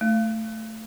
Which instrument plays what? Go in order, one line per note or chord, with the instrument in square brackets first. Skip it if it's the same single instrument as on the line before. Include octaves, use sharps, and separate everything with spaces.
[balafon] A3